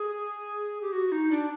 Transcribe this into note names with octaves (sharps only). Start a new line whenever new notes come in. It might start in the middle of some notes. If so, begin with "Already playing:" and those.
Already playing: G#4
G4
F#4
D#4
D4